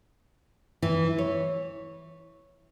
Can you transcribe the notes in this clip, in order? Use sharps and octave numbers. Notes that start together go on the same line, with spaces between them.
E3
C#5